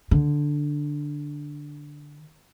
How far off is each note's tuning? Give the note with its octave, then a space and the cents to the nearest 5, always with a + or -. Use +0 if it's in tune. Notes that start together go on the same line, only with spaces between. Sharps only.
D3 +0 D4 +0